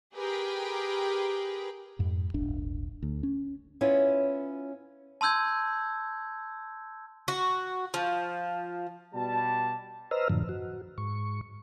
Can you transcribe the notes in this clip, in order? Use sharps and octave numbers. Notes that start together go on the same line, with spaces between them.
G4 G#4 A#4 B4 G5
F2 G#2
D1 G1 D4
D2
C#4
B3 C#4 E4 F4
A5 C6 E6 G6 G#6
F#4
F3
B2 G3 A5
B4 C5 D#5 A#5 E6 F6
F#2 A2 D3 F3
F#4
G#2 C#6